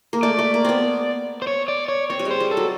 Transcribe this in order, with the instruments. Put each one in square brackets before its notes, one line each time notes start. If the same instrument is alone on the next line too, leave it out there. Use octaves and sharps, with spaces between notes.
[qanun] A#3
[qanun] A3 [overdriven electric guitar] D5
[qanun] A3
A#3
B3 C4
[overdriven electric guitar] C5
C#5
D5
C#5
[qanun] C4 [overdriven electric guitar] C#5
[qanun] G3
G#3
[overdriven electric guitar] C5
[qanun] G3
[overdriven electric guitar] A4
[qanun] F#3